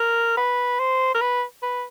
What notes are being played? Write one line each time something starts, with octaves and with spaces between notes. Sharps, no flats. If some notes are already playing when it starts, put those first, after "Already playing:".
Already playing: A#4
B4
C5
A#4
B4
B4